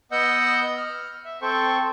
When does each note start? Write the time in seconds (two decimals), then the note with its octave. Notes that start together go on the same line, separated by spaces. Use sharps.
0.12 B3 D#5 F#5 E6 G6
0.77 F6
1.25 E5
1.42 C4 A4 C5 G5 C#6